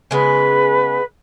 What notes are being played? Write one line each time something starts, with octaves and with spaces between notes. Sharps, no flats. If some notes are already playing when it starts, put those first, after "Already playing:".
C#3 G#3 B3 B4